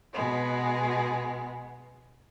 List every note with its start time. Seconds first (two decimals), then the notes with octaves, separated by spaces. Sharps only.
0.13 B2 G#3 B3